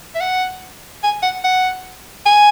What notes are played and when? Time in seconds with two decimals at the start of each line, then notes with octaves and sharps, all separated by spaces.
0.15 E5
0.21 F#5
1.04 G#5
1.23 F#5
1.44 F#5
2.26 G#5